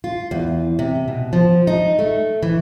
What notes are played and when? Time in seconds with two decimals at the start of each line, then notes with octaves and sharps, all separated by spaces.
0.04 F4
0.31 E2
0.79 C3
1.08 B2
1.33 F3
1.67 D#4
1.99 A3
2.43 E3